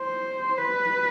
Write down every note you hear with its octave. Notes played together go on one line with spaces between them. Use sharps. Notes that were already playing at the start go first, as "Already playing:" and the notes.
Already playing: C5
B4